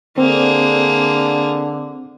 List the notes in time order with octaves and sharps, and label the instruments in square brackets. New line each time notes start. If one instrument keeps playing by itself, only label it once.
[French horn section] D3 [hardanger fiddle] A#3 G#4 [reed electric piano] C4